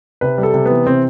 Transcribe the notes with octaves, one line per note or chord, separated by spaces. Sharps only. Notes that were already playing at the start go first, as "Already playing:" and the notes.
C3 B4
G3
A4
C3
B3
E3
C3 C4